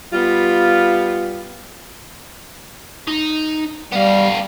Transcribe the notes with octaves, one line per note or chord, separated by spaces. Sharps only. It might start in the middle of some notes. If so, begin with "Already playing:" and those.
G3 B3 F4
D#4
G3 B3 F5